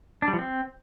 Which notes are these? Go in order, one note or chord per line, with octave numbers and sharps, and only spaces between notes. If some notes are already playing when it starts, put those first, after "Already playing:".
D4
G3
F3
C4